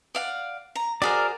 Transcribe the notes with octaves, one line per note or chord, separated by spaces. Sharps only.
D5 F5 F#5
A#5
F#4 G#4 A#4 C5 D5